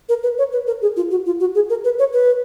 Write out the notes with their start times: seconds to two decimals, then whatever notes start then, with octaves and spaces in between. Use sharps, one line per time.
0.09 A#4
0.23 B4
0.38 C#5
0.52 B4
0.67 A#4
0.82 G#4
0.97 F4
1.11 F#4
1.26 F4
1.40 F#4
1.55 G#4
1.70 A#4
1.84 B4
1.99 C#5
2.13 B4